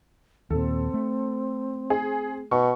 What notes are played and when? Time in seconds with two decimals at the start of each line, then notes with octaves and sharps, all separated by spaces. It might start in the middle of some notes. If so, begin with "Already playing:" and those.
0.50 D#2 A#2 C4 A4
0.94 A3
1.90 G#4
2.51 B2 C#6